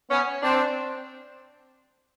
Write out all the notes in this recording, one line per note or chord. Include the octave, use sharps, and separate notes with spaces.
B3 C#4
C4 D4